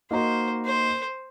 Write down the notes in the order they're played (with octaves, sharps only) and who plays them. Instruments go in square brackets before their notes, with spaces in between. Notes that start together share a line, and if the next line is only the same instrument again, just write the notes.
[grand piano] A#3 D#4 F#4 A#4 D#5 [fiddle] C5
[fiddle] C5